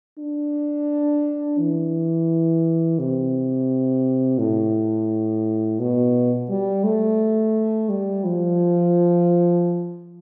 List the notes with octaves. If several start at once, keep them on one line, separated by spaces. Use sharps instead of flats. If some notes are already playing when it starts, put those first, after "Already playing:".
D4
E3
C3
A2
B2
G3
A3
G3
F3